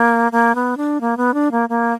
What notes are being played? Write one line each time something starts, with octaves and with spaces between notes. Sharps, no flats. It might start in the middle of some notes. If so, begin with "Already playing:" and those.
Already playing: A#3
A#3
B3
D4
A#3
B3
D4
A#3
A#3